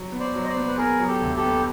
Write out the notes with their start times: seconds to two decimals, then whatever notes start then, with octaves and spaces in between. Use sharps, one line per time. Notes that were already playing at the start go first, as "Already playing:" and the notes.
Already playing: F#3
0.12 B3
0.19 C5 D5
0.34 F#3
0.43 D#5
0.49 C5 D5
0.56 B3
0.68 B4
0.77 B3 G#4 A#4
0.99 F#3
1.07 G4 A4
1.22 D2
1.36 G4 A4
1.44 B3